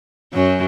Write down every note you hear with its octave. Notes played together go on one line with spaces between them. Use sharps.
F#2 F#3